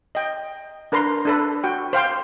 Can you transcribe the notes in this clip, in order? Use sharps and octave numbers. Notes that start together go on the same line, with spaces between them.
D#5 G5
D4 A#4 B4 A#5 C6
D4 A4 B4
F#4 G5
C5 F5 G5 C6